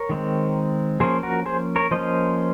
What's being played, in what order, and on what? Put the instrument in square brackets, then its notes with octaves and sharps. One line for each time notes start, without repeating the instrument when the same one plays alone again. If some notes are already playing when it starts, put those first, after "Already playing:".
Already playing: [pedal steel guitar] A#4 C#5
D#3 G#3 C4
F3 A#3 C#4 G#4 C5
F#4 A#4
G#4 C5
A#4 C#5
F3 A#3 C#4 C5 D#5